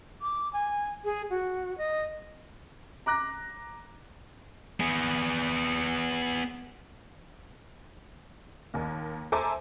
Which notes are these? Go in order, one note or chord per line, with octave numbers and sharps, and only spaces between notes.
D6
G#5
G#4
F#4
D#5
A#5 D6 F#6 A#6
B3 G#4
D#2 D#3 A#3
A4 C5 E5 G#5 A#5 D6